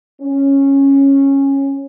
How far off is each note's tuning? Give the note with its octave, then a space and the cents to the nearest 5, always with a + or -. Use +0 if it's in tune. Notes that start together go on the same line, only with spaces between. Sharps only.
C#4 -10